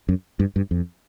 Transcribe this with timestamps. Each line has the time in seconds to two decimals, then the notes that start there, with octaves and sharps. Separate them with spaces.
0.09 F#2
0.40 G2
0.56 G2
0.71 F2